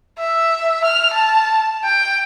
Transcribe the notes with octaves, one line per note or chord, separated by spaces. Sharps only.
E5
F6
A5
G5